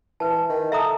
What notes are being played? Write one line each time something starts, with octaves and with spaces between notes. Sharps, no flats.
E3 B4 A5
D#3
A4 E5 A#5 D#6